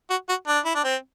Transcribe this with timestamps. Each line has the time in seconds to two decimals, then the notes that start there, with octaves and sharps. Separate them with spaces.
0.10 F#4
0.29 F#4
0.48 D4
0.65 E4
0.75 D4
0.84 C4